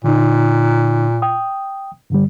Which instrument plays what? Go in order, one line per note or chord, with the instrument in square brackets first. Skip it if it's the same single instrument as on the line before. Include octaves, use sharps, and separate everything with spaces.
[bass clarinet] A#2 [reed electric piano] D3 D#4
[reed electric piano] G5 D#6
G2 D3 G3